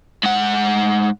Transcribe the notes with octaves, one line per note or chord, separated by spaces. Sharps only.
G#2 F#5